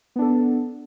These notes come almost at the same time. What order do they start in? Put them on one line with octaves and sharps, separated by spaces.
B3 D4 A4